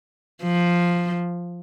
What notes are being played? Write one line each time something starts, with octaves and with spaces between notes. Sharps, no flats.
F3